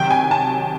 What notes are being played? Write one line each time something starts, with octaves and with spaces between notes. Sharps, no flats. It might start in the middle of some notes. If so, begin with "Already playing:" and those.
Already playing: C3 D#3 F#3 G5
G#5
A5